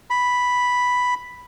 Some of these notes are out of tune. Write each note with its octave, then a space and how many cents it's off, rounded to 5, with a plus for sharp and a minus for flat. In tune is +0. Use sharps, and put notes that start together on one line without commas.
B5 +0